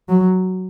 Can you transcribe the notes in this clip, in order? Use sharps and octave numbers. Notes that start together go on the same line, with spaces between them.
F#3